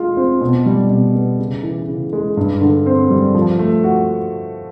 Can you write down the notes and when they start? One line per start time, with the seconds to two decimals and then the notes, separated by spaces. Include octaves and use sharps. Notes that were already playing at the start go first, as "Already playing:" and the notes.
Already playing: G#3 F4
0.17 C4
0.41 B2
0.66 G3
0.90 B2
1.15 B3
1.39 C#3
1.63 E3
1.88 C#3
2.13 G#3
2.37 G2
2.61 D3
2.86 C4
3.10 G3
3.35 F3
3.59 A3
3.84 F#4